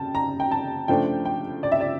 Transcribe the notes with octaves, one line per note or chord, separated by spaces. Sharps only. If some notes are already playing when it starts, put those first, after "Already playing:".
Already playing: C#3 G5 A5
A#5
G5
A5
C#3 F3 A3 D4 G5
G5
D5
E5
D5